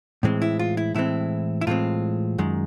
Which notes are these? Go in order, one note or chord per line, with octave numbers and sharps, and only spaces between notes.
A2 E3 G#3 C4
E4
F4
E4
A2 E3 G#3 C4 E4
E4
A2 E3 G#3 C4 F4
F#2 D#3 G#3